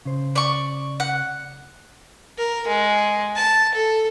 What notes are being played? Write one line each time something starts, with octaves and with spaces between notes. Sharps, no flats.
C#3 C5
D5 C#6
F#5
A#4
G#3
A5
A4